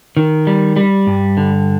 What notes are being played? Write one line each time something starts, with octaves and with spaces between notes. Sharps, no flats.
D#3
G3
G3
G2
D3